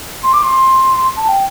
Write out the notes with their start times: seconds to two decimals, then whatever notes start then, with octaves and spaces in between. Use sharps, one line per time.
0.23 C6
0.33 D6
0.43 C6
1.16 A5
1.28 G5